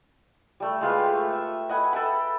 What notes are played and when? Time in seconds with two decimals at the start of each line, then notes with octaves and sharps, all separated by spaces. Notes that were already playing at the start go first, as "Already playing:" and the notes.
0.60 G3 A3
0.81 G#3 F4 G4 B4
1.13 A3
1.33 E5
1.69 D#5 F#5 G#5 B5
1.93 A4 E5 G5 B5